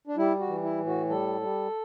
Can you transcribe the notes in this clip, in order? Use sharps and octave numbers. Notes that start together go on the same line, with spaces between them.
D4
G3 E4
F#4
E3
E4
A2
F#4
G3 A4
G3